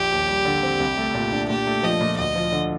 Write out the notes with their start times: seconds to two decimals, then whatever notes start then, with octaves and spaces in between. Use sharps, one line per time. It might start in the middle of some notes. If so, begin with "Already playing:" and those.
Already playing: A#1 G4
0.12 D#2
0.29 G3
0.45 D3
0.63 C4
0.80 C2
0.98 A3
1.14 A#2
1.32 D4
1.50 A#2 G4
1.67 A3
1.83 F3 D#5
2.01 A#2
2.18 D2 D#5
2.35 F3
2.52 D3